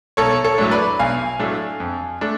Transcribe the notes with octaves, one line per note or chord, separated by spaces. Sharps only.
B1 A4 C#5
A4 C#5
A2 F#3 A3 D4
B4 D5
B1 F5 G#5
A2 F#3 A3 D4
F2
A3 D4